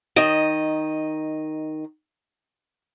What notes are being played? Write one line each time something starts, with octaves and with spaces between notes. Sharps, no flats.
D#3 D#5